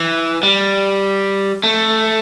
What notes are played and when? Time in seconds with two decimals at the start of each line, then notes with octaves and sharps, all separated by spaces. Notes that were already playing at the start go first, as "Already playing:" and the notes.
Already playing: E3
0.43 G3
1.64 A3